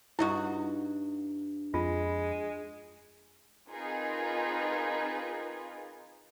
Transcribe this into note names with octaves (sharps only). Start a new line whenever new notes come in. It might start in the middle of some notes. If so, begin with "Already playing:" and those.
G2 D#4 E4 F#4 D#6
F2 G#3 F4
C4 D#4 F4 G#4 A#4 B4